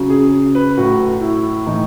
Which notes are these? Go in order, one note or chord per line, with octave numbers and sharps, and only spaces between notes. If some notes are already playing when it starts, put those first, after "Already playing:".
Already playing: C#3 F#3
G#4
B4
A2 F#3 F#4
E4
A2 E3 D#4